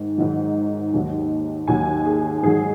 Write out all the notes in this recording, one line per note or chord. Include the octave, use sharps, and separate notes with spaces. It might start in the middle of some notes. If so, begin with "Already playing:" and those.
Already playing: G#2 D#3
G#2 D#3 F#3
D#2 D#3 F#3
D#2 D#3 F#3 G#5
G#4
G#2 D#3 F#3 G#4